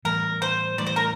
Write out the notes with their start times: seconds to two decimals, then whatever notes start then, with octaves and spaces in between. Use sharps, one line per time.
0.05 A2 E3 G3 A#4
0.42 C5
0.78 A2 E3 G3 D5
0.87 C5
0.96 A#4